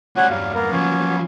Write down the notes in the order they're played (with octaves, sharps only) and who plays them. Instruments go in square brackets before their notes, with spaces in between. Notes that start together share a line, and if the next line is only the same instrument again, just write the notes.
[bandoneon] G3 C#4 C#5 [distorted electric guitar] A3 F#4 [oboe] F#5
[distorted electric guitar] E2 G2 [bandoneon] F#3 G3 [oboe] F5
[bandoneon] A#3 B3 [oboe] A#4
[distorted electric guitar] F3 F#3 [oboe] C#4